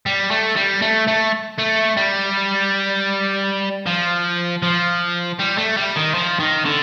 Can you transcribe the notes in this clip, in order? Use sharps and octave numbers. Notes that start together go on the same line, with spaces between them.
G3
A3
G3
A3
A3
A3
G3
F3
F3
G3
A3
G3
D#3
F3
D#3
D3